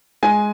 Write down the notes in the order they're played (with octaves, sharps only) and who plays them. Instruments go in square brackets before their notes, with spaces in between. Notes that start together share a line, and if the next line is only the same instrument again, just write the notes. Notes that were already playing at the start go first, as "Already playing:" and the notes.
[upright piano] G#3 G#5